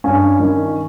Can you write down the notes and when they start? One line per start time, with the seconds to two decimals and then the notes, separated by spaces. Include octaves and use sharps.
0.04 G2 C#4
0.40 D#3